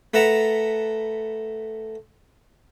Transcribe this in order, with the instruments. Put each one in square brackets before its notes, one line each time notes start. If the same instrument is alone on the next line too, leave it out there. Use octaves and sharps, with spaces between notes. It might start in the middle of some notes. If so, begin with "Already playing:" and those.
[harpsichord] A3 B4 F#5 A5 A#5